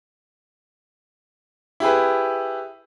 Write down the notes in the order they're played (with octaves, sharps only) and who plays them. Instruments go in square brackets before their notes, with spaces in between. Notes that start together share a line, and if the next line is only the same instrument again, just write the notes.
[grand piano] E4 G4 G#4 B4